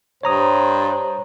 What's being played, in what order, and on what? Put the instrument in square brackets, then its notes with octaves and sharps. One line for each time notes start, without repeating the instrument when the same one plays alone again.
[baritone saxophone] G2 [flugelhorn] C5 [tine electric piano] C#5 A#5 D#6